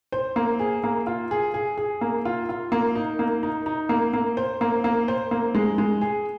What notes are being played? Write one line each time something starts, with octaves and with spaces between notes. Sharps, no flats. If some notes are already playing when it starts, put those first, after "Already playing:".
C5
A#3
G#4
A#3
F4
G#4
G#4
G#4
A#3
F4
F4
A#3
D#4
A#3
D#4
D#4
A#3
A#3
C5
A#3
A#3
C5
A#3
G#3
G#3
G#4